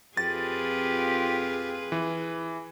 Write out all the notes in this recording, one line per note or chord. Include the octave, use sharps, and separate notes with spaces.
F2 F4 G4 G#4 B4 A6
E3